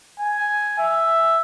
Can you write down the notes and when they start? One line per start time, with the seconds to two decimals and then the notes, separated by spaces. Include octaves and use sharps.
0.20 G#5
0.79 E5